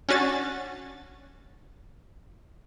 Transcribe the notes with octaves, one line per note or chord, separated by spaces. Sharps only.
C#4 D4 F#4 A6